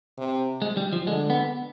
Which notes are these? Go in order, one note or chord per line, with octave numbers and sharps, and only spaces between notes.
C3
G#3
G3
F3
D3 G#3
B3